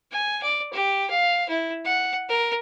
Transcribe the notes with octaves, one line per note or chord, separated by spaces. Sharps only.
G#5
D5
G4
F5
E4
F#5
A#4